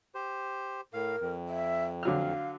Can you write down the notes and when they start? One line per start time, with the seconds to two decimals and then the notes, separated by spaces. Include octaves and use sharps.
0.15 G4 C5
0.93 A2 A#4 F5
1.21 F2
1.48 E5
2.03 D3 F#3 F5 F6